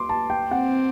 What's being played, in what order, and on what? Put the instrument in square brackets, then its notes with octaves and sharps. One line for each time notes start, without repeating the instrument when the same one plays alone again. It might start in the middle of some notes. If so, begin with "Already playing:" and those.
Already playing: [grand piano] C6 D6
A5
G5
[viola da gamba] C4 [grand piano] F#5